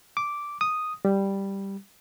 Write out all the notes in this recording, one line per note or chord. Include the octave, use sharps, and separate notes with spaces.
D6
D#6
G3